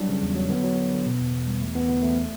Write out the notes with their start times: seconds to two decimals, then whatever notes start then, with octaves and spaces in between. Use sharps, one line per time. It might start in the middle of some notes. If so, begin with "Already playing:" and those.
Already playing: F#3 G3 D4
0.09 C#3
0.22 E2
0.35 F#3
0.49 D3 B3
0.63 F#3
0.77 D3
0.91 D3
1.05 B2
1.20 E2
1.33 E2
1.46 G3
1.61 E2 A3
1.75 E2 B3
1.88 D3 B3
2.02 E2 A3